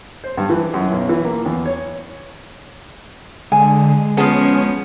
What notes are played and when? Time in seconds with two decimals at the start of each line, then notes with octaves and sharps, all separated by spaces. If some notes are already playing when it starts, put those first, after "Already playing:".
0.24 C5
0.37 G2
0.50 E3
0.74 F#2
0.92 B1
1.09 E3
1.25 A#3
1.46 E2
1.65 C#5
3.52 D3 G#3 G#5
4.17 F3 B3 C#4 G#4 A5